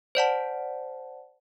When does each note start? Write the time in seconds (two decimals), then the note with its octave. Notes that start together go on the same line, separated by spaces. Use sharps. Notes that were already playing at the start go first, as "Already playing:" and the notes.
0.15 C5 D5 F#5 A5